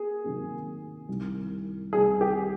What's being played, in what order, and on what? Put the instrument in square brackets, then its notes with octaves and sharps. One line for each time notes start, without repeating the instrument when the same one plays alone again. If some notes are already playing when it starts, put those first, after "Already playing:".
Already playing: [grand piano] A#3 [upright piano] G#4
[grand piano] C3 D#3 F#3 A#3
C2 C3 D#3
[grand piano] C2 C3 D#3 [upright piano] G#4
[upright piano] G4